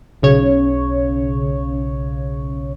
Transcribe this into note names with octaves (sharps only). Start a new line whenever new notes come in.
B1 C#3 C#5